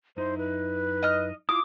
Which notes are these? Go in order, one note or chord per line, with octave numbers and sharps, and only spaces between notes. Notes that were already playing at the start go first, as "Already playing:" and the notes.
F#2 D#4 E4 C5
B4
D#5 F6
E4 F4 D6 D#6